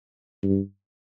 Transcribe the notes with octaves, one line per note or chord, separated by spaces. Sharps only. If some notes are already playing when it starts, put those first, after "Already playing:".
G2